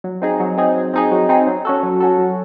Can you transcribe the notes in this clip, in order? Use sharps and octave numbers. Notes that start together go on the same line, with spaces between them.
F#3
C4 D#4 G#4
F#3
C4 D#4 G#4
F#3
C4 D#4 G#4
F#3
C4 D#4 G#4
F#3
C#4 F#4 A4
F#3
C#4 F#4 A4
F#3